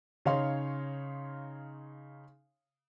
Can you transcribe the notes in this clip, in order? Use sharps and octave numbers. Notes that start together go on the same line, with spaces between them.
C#3 D#4 C#5 F5 C6